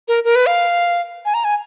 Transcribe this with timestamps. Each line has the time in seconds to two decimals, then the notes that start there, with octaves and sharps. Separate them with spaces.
0.08 A#4
0.24 A#4
0.35 B4
0.46 F5
1.25 G#5
1.34 A#5
1.44 G#5